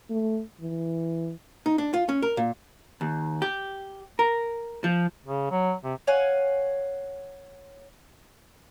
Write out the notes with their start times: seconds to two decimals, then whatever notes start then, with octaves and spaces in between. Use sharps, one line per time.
0.10 A3
0.61 E3
1.66 D#4
1.78 D4
1.94 F4
2.09 C#4
2.22 A#4
2.37 A#2
3.01 D#2
3.42 G4
4.19 A#4
4.84 F3
5.25 C#3
5.51 F#3
5.84 C3
6.07 C#5 F5 F#5 G#5